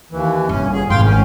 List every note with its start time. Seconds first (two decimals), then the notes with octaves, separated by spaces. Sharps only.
0.12 D#2 E3
0.49 G1 C#4
0.73 G#4
0.90 G#1 F5 G5 C6
1.05 C#4